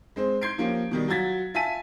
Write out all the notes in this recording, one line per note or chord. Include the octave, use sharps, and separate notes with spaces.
G#3 C4 C5
C6 G6 G#6 C7 D7
F3 A#3 C#4 G4
B2 D#3 G3
F#3 F4 F#4 G#6 A6 B6
F4 E5 G#5 A5 B6 D#7